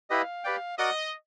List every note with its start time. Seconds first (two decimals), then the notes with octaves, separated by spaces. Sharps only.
0.10 E4 G4 B4 D#5 F5
0.44 G4 B4 D5 G5
0.79 F#4 A#4 D5 D#5 F#5